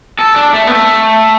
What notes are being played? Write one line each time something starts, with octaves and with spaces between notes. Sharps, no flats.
A4
D4
A3
B3
A3